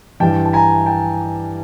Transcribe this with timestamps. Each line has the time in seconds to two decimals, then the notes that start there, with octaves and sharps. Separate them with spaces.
0.20 G2 E3 G3 G5 A5
0.45 A5
0.53 G#5 A#5
0.86 G5 A5